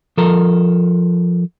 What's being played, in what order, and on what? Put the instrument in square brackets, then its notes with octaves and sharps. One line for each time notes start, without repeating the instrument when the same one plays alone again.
[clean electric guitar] F3 A4 A#4